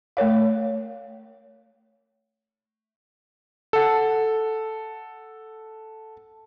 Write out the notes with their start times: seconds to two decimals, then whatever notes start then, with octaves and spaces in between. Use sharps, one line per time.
0.17 A3 A#4 C#5 F5
3.73 A4 F#5